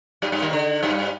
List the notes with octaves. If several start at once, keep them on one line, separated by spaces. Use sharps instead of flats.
G2 G3
G2 G3
D#2 D#3
D3
G2 G3